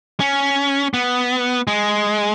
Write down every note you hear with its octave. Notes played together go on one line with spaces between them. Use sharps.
C#4
B3
G#3